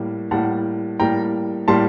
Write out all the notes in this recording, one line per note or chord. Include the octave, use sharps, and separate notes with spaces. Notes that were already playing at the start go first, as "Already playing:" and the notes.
Already playing: A2 G3 A#3
A2 G3 A#3 F#5 A5
A2 G3 A#3 G5 A#5
A2 G3 A#3 A5 C6